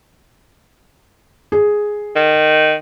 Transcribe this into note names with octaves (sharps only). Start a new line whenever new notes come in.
G#4
D#3